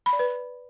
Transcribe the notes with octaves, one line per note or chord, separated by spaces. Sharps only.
B5
D5
B4